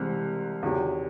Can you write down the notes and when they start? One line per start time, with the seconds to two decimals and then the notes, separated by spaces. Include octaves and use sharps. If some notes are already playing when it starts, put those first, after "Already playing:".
Already playing: C2 C3 E3 G#3 C4
0.63 E2 C3 D#3 F#3